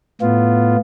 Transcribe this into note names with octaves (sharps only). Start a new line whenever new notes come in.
A2 B3 F4